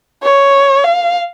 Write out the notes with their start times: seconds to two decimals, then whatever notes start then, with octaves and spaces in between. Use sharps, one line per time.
0.23 C#5
0.84 F5